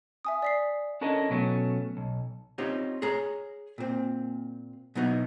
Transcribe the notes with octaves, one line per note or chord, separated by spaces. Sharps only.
E5 G#5 D#6
D5 B6 C7
C#4 D4 E4 A4 A#4 D#5
B2 F#3 A3 C#4
B1
C4 C#4 D#4 F4 G4 C#5
G#4 C#5 A#5
A#2 C4
B2 F#3 B3 D#4 E4